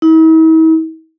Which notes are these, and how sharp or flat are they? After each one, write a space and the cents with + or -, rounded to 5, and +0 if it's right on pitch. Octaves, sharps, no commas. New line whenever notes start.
E4 -45